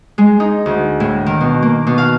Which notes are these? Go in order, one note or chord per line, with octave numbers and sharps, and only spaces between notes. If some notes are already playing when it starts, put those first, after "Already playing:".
G#3
D#4
D2
A2
D#3
B2
A#3
B2
F5